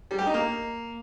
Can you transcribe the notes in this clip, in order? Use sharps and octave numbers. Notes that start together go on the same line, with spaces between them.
G3
G4
D#4
A#3